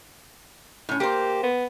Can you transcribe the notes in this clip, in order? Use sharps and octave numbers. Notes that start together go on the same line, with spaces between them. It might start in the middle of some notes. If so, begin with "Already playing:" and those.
A2 C#4
A#3 G4 C5
B3